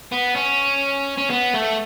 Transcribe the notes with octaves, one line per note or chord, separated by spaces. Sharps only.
B3
C#4
C#4
B3
A3